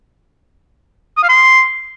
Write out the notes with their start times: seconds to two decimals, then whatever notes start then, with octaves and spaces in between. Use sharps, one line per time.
1.17 D#6
1.23 F5
1.29 C6